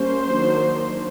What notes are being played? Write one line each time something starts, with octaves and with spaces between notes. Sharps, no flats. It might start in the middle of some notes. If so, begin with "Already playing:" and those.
Already playing: G3 A#3 C#4 C5
D#3 F#3 A#3 D4